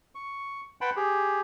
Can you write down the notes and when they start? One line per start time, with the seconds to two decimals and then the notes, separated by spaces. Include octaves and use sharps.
0.15 C#6
0.81 B4 F#5 G5 A5 B5 C6
0.96 G4 G#4